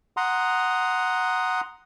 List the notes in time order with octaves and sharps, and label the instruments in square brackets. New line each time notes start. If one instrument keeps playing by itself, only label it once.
[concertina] F#5 A#5 C6 D#6